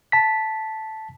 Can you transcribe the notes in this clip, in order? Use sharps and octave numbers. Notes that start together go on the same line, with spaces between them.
A5 B6